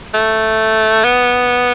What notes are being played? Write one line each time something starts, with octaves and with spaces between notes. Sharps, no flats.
A3
B3